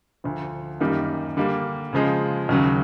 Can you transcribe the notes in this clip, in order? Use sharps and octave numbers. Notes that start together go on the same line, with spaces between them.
D2 D3 F3
F#2 D#3 G3 A#3 D#4
D3 G3 A#3
C#3 F3 G#3
D#2 C#3 F#3